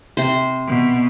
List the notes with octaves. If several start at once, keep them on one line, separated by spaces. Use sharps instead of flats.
C3 C5
B2